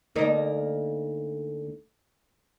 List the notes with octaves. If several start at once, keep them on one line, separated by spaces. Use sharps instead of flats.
D2 A#3 D#4